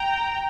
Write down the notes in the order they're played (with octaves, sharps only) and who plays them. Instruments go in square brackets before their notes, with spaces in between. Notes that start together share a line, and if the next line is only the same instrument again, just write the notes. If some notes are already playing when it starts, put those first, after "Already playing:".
Already playing: [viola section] G5 A#5